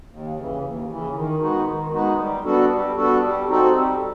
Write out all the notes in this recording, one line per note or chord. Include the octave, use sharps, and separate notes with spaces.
D#2
C#3 E3
D#2
C#3 E3
D#3
G#3 B3 D#4 F#4
D#3
G#3 B3 D#4 F#4
G3
B3 D4 F#4 A4
G3
B3 D4 F#4 A4
G3
C4 D#4 F#4 A4
G3